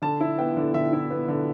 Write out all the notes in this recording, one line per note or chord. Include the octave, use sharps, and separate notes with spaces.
D3 A5
E4
B3 G5
D3
D3 E5
E4
B3
D3